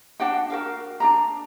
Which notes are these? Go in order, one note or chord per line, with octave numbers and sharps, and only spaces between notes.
D4 F#4 F#5 G5
F#4 A#4 F5
D4 G#4 A#5